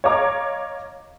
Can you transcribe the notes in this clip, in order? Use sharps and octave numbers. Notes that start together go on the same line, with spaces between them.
C#5 D#5 F5 A#5 D6